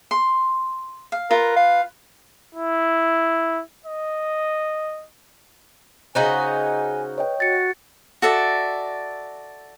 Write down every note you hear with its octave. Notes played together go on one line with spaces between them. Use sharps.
C6
F5
F4 A#4 B4
F5
E4
D#5
C#3 D#4 F#4 C5 G#5
B4 C#5 D#5 G5
F#4 A6 C#7
F#4 A4 D5 E5